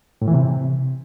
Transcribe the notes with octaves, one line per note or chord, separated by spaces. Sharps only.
A2
E3
C3